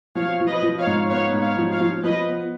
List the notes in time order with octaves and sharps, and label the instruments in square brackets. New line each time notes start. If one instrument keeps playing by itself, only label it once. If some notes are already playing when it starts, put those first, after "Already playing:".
[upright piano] F3 [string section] C#5 F5
[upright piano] F3
[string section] B4 D#5
[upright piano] F3
[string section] C#5 F5
[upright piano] G#2
[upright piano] B3 [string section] C#5 F5
[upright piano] G#2
[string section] C#5 F5
[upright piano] F3
[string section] C#5 F5
[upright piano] F3
[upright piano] F3 [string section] B4 D#5
[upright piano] B3